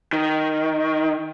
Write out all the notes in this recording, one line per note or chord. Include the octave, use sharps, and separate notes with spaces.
D#3